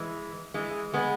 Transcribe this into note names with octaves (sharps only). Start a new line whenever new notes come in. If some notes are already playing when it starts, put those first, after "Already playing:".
Already playing: E3 G#3
E3 G#3
G#3 B3